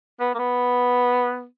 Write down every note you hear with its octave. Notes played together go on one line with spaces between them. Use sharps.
B3
A#3
B3